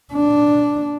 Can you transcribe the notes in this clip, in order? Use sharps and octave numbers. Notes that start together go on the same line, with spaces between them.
D4